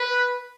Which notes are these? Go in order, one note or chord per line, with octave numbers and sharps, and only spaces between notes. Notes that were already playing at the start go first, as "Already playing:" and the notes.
Already playing: B4